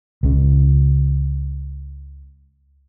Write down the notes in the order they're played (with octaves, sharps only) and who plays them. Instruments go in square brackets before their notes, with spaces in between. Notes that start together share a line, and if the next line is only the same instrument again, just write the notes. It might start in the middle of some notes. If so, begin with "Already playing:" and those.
[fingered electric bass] C#2 C#3